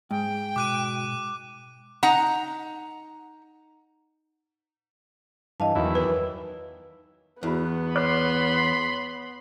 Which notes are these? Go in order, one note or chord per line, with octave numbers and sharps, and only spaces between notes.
G#2 G5
B2 D6 F#6 D#7
D#4 F#5 A#5
G2 E3 D#5 F5 A5
E2 D#3 E3 F#3 E4
B4
E2 B3 E4 F#4 B4
C#5 B5 C6 D6 F#6